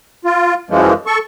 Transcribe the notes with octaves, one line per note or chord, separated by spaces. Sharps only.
F4
F#2 E3 F3 G#3
A4 C#6